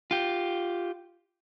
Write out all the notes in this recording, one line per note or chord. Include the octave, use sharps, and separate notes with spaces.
F4 G4